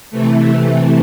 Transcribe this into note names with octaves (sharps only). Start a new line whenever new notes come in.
C3 E3 A3